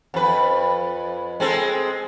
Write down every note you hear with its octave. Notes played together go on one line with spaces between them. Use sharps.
F2 B4
G#3 C4 A4